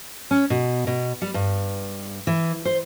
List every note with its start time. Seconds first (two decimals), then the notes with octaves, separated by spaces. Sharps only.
0.31 C#4
0.50 B2
0.87 B2
1.22 G3
1.34 G2
2.27 E3
2.65 C5